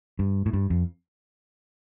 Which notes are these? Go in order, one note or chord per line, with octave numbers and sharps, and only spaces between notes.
G2
A2
G2
F2